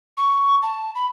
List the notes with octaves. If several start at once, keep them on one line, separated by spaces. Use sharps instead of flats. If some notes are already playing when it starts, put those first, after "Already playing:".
C#6
A5
B5